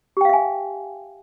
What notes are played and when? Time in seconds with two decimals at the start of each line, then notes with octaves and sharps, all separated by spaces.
0.17 G4
0.21 G5
0.25 F5
0.29 E5
0.33 G#5